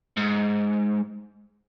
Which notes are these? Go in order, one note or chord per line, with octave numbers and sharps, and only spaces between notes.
G#2